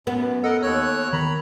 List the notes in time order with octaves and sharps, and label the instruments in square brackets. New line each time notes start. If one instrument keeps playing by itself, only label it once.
[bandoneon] F#2 [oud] B3
[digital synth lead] A4 [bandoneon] A#4 D#5 F#5
[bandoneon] D#2 C#5 F#6 [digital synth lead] E6
[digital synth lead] D#3 [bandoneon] A#5 B5